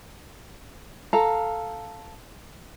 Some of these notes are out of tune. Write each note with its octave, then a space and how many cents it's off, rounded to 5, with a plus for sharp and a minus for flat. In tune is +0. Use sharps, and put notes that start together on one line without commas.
A4 +0 F5 +0 A#5 -5